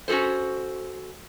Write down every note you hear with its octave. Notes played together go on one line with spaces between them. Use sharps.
C#4 F#4 G#4 A4 C5